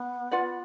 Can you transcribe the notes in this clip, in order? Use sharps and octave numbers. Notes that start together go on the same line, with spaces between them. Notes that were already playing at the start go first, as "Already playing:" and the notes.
Already playing: B3
F4 B4 D5 F#5